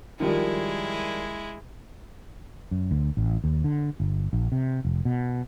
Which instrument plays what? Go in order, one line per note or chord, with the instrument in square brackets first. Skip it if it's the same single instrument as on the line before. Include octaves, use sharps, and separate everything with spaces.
[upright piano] D#3 F3 G3 [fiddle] G#3 E4
[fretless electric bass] F#2
D2
A1
D#2
D3
G1
A#1
C3
F1
B2